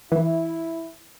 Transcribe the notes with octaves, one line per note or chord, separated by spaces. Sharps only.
E3 E4